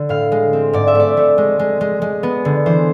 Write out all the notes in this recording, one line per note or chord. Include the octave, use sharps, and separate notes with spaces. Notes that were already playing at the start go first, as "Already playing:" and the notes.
Already playing: D3
A2 F5
G#3
C4
G#2 D5
E5
A3 D5
A3
G#3
G#3
G#3
G#3
B3
D3
E3 C5